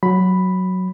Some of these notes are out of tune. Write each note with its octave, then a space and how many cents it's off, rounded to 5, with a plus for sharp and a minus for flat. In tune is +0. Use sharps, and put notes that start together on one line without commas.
F#3 +0 B5 +0